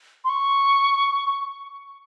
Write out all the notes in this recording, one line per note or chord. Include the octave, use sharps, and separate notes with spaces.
C6
C#6